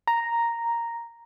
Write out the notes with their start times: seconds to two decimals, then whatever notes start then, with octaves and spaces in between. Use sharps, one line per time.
0.07 A#5